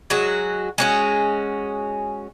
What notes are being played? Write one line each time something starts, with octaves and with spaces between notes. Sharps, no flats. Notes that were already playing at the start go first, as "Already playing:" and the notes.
F#3 G#3 F#4
G#3 C#4 F#4